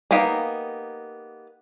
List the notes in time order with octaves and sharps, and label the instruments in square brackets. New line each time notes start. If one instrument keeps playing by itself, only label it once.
[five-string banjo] A#3 B3 D#4 G4 F5